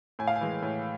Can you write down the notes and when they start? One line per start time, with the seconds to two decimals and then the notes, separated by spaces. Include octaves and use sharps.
0.19 A2 G#5
0.28 F5
0.36 G#5
0.41 E3 G#3
0.62 A2